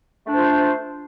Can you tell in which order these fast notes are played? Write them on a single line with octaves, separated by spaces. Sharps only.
A3 D4 C5 F4